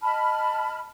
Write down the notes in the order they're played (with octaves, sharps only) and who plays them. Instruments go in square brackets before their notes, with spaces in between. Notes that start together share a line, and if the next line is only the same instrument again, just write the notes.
[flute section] D#5 A5 B5 F6